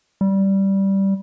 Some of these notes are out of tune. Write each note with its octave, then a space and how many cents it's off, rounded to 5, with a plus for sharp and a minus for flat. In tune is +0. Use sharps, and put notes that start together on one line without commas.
G3 -10